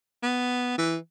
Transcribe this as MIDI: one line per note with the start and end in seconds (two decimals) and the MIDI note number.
0.22 0.76 59
0.78 0.97 52